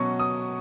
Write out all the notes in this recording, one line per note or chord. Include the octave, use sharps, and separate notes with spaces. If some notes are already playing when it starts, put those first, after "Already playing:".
Already playing: B2 F#3 C#4 C#6
D#6